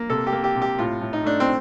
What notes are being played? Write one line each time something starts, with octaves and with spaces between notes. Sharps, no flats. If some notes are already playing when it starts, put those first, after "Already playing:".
Already playing: A#3
C3 A4
G4
A#3
G4
C3
G4
A2 F4
A2
D#4
A3 D4
C4